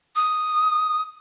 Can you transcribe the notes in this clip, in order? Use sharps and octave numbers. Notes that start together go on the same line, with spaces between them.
D#6